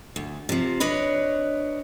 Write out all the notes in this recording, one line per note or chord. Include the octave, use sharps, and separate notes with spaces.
D2
C3 F3
D4 B4 C#5 D#5